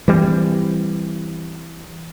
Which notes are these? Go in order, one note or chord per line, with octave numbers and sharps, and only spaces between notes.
E3 G3 A3 C4